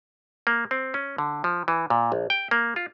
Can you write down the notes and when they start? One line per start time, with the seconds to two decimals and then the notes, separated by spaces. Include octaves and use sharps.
0.47 A#3
0.71 C4
0.94 C#4
1.18 D3
1.44 F3
1.68 E3
1.90 A#2
2.12 A#1
2.30 G5
2.51 A#3
2.76 F4